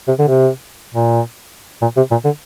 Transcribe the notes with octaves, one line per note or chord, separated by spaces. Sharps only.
C3
D3
C3
A#2
A#2
C3
A#2
D3